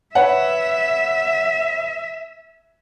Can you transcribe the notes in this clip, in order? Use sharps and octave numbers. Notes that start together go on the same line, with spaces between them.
B4 C#5 E5 F#5